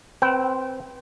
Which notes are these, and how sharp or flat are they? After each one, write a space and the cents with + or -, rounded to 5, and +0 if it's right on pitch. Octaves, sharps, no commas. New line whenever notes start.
C4 +0 B4 +0 G5 -35